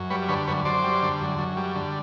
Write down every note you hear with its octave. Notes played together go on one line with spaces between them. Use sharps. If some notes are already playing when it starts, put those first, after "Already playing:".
Already playing: F#2
G3 B4 C#5
D3 B4 C#5
F#2 B4 C#5
F#2 C5 D5
G3
D3
F#2
F#2
G3
D3